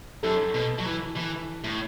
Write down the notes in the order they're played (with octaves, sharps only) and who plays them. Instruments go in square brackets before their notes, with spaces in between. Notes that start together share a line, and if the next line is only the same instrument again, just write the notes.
[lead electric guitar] F#2 [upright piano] A4
[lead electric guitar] B2
F#3
E3
E3
A2